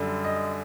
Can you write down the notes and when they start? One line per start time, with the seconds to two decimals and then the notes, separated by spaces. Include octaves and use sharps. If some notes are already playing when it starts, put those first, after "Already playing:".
Already playing: F#2 D3 G3
0.24 D#5